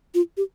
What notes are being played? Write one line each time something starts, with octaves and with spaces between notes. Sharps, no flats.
F4
G4